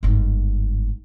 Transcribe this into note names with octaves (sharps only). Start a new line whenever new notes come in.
G1 G#2